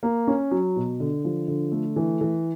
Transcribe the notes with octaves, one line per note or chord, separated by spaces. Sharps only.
A#3
C#4
F#3
B2
D3
F3
D3
A3
E3
E3